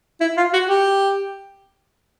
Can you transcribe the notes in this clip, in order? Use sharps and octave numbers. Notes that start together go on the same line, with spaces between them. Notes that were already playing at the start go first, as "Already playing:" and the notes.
E4
F4
F#4
G4